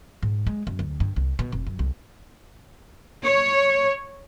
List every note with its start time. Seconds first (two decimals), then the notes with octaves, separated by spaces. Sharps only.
0.23 G#2
0.47 G#3
0.67 F#2
0.79 D2
1.00 G2
1.16 C2
1.39 B2
1.52 F1
1.67 F#2
1.79 C2
3.24 C#5